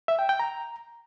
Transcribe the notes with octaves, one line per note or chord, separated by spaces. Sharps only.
E5
G5
G5
A#5